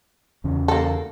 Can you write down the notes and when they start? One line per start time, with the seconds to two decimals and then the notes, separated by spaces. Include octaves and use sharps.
0.44 E2 C#3 C#4
0.68 A#3 A4